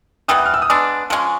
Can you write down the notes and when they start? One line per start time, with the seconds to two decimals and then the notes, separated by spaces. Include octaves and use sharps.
0.28 E3 G3 B3 D#6
0.38 F#6
0.45 F6
0.54 E6
0.62 D#6
0.70 G#3 B3 D4 D6
1.10 F3 G#3 C#4 G#5